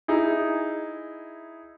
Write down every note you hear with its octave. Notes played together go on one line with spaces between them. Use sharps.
D#4 E4 G#4